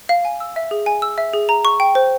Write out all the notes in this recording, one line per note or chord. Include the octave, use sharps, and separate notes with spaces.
F5
G#5
E6
E5
G#4
G#5
E6
E5
G#4
A#5
C#6
G5
C5